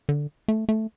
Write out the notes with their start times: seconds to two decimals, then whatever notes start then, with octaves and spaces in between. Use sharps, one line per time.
0.09 D3
0.48 A3
0.69 A3